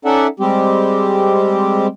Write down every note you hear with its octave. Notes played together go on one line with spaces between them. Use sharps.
C#4 D#4 A4 D5 E5 F#5
G3 G#3 C4 G4